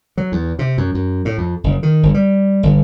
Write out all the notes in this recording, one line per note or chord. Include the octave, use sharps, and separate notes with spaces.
F#3
E2
C3
F#2
F#2
A2
F2
F#1
D#3
G1
G3
G1